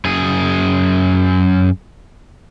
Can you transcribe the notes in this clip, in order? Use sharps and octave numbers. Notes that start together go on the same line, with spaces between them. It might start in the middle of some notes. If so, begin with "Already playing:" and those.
F#2 G#4